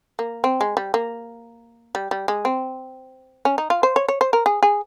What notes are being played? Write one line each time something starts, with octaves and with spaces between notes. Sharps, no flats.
A#3
C4
G#3
G3
A#3
G3
G3
G#3
C4
C#4
D#4
F4
C5
C#5
C#5
C5
A#4
G#4
G#4